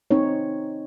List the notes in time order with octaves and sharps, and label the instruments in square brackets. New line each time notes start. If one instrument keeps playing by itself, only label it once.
[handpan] C4 D#4 C#5